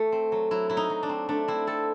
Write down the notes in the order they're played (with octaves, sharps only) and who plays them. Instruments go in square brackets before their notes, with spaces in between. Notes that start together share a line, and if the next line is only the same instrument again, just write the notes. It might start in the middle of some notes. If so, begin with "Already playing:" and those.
Already playing: [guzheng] A3
C4
F#3
F#3 E4
F#3 E4
D#4
F#3
D4
C4
A3 D4
C4 E4
C4 A4